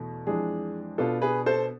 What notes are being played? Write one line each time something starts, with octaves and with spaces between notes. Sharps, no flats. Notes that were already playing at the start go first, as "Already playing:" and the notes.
Already playing: E2 B2 A3
F2 E3 G#3 D4 G#4
B2 B3 D4 F4 A4
G#4 B4
A4 C5